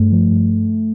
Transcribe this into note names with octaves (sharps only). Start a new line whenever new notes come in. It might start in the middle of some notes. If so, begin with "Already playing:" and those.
Already playing: G2 A3
F3
G2